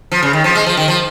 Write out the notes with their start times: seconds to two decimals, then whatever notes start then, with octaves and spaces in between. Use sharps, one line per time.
0.12 F3
0.23 C#3
0.33 D#3
0.44 F3
0.55 G#3
0.67 F3
0.77 D#3
0.88 F3